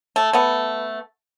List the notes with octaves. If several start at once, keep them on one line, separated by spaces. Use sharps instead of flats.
A3
A3 B3